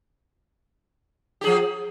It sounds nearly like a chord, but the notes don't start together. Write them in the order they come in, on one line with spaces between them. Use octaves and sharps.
G4 G#4 F3